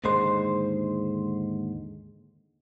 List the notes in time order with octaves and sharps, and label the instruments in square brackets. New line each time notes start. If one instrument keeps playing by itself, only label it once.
[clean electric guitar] D#2 G#2 D3 G#3 C5 C6